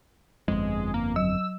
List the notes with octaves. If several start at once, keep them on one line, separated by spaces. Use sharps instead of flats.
G1 F2 G#3
A#3
F#3 E6